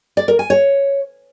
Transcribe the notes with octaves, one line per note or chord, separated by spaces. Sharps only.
D5
A#4
G#5
C#5